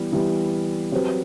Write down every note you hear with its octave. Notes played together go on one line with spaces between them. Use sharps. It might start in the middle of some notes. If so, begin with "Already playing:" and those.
Already playing: E3 G3 B3
E3 G3 B3
F#3 C4 G4 B4